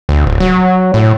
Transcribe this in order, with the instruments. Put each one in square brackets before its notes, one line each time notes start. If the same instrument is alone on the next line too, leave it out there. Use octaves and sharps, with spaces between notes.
[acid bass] D2
D1
F#3
A2